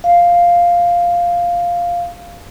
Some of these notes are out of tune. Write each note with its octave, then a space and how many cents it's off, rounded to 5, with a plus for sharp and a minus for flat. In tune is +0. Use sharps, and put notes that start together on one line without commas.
F5 +0